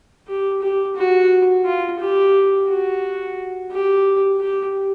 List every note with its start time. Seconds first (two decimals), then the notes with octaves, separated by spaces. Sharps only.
0.28 G4
0.62 G4
0.96 F#4
1.65 F4
1.99 G4
2.68 F#4
3.71 G4
4.40 G4